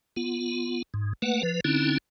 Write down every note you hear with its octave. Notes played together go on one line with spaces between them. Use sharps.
B3 F4
G#2
A3 A#3 B4 F#5
F3 B4
D3 C4 C#4 D#4 E4